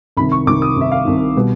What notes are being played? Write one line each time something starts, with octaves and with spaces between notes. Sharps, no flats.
C2 C3 D#3 B5
C#6
C2 C3 D#3 D6
D#6
C2 C3 D#3 E5
F5
C2 C3 D#3
B2 G3